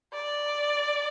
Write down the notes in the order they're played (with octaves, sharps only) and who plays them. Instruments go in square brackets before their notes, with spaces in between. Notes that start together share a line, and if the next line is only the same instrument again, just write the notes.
[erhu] D5